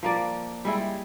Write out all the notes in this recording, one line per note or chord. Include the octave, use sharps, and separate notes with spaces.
F3 A#3 D5
G3 G#3 E4